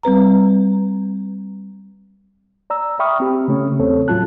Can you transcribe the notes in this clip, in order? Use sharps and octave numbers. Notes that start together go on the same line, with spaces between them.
G3 C4 B4 A#5
D5 A#5 E6
E5 G5 B5 C#6 D#6 F6
C4 G4
C#3 A3 C#4
E2 C4 A4 C#5
D#2 A2 F#3 F4 A5 F#6